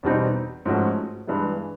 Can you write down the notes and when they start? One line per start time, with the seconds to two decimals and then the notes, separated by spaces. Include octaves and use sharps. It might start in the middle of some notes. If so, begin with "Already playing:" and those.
0.03 E2 B2 G3 C4 D#4
0.65 G#2 F3 A3 C#4 F#4
1.27 G2 E3 G#3 B3